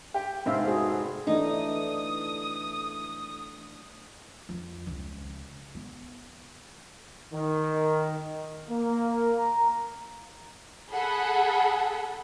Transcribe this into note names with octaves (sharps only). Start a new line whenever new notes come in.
G4 G5
F1 G#2 C4 E5 F5
F#4 G#4
E3 A3 D4 D#4 D#6
F2
C#2
B3
D#3
A#3
A#5
G#4 A4 F#5 B5